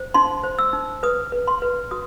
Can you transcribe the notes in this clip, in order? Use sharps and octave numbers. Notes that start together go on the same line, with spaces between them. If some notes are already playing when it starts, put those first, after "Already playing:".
Already playing: C5
D#4 C6
C5
E6
D#4
B4 D#6
B4
C6
B4
F#4 D#6